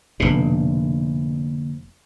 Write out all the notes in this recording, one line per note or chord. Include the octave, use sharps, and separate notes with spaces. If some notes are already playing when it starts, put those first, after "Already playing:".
F1 B2 D3 A#3 D4